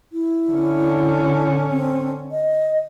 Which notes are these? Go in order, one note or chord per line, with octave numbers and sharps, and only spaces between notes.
E4
D3 C#4
C4
D#5